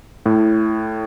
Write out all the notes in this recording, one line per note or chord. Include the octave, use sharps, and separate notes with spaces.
A2